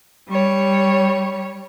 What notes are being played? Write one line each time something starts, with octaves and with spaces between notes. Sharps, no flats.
G3 C#5